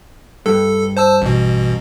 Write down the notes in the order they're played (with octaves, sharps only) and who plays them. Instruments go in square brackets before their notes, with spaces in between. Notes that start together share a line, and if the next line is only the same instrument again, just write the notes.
[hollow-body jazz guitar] G2 [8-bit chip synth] A4
[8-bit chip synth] C5 A5 E6
A1 B2